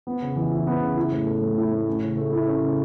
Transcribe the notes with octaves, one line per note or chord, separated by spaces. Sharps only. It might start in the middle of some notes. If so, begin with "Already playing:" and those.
B3
C#3
E3
E4
B3
C#3
E4
A2
A3
A2
E4
A2
C#4
C#3
A3
E4
C#4
C#3